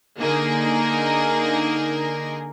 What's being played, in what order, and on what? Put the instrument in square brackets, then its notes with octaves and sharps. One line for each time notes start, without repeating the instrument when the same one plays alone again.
[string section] D3 A#3 D#4 G#4 A#4